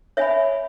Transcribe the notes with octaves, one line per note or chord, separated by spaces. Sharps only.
C#5 E5 G#5 B5